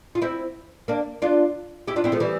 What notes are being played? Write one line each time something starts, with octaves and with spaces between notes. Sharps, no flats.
F4
C4 E4
A#3 D4
D4 F4
E4 G4
D4 F4
C4 E4
F3 A3
E3 G3